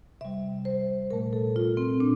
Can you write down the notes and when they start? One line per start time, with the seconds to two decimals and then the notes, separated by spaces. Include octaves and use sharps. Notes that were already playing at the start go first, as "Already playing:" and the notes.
0.21 C3 G3 E5
0.65 C5
1.10 A#2 A3 A#4
1.33 A4
1.56 F4
1.77 C4
2.00 A#2 D4